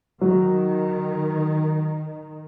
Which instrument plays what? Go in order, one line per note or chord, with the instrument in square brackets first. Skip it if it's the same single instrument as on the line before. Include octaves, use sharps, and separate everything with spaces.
[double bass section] D#3 [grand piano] F#3